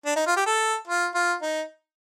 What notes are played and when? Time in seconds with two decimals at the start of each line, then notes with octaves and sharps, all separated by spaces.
0.06 D4
0.16 D#4
0.27 F4
0.36 G4
0.46 A4
0.87 F4
1.14 F4
1.42 D#4